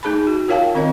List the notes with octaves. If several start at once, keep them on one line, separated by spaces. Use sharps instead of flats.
A3 D#4 G#4 A5 B5
F#4
F4 A#4 C#5 F5 G5 A5
D#3 C4 A#4 D#5